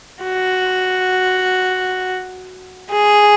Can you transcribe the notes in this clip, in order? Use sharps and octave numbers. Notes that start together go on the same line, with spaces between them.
F#4
G#4